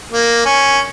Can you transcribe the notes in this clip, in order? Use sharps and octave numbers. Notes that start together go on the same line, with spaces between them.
A#3
C#4